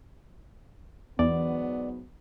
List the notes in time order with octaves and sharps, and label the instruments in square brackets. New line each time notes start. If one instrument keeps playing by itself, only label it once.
[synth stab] E2 [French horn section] G#2 F#3 B3 [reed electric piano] D5